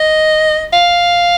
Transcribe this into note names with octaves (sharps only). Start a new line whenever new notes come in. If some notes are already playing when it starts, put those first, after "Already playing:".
Already playing: D#5
F5